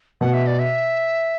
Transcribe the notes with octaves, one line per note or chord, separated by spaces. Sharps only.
B2 F#5
E5
D5
E5